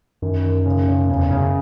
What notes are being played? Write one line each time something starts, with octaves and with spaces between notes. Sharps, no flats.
F#2 D#3
D#3
C#3
C#3
E2 C#3
F#2 C#3